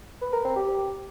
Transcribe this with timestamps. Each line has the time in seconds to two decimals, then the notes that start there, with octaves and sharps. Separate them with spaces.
0.21 B4
0.33 A#4
0.44 C4
0.56 G4